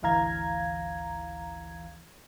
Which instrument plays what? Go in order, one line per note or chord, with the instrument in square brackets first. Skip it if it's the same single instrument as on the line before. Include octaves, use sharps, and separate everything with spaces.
[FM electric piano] G#1 D2 E3 F5 A#5 G#6